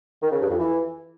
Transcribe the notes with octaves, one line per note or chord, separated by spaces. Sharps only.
D#3
C#3
G2
F2
E3